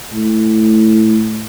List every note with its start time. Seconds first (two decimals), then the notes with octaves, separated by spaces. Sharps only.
0.12 A2